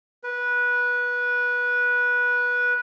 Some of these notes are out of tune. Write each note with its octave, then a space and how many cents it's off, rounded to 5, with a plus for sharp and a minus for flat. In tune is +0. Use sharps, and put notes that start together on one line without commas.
B4 -15